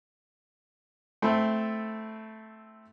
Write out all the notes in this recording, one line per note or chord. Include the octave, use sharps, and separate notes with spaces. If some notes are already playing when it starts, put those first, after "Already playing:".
A3 C4 E4